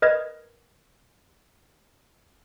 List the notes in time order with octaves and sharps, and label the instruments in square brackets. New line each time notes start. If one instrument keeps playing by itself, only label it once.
[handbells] A#4 B4 D#5 F6 G#6